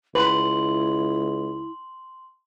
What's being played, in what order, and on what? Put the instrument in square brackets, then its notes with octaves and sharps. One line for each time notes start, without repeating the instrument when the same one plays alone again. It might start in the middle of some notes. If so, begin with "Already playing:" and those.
[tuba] C#2 [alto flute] E4 [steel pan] B4 [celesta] C6 F#7